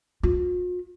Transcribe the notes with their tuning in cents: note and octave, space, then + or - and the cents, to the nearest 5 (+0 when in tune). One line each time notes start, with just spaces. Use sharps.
F4 +45